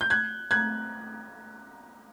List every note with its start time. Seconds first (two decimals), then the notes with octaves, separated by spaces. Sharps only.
0.01 G6
0.10 F#6 G#6
0.51 F#6 G#6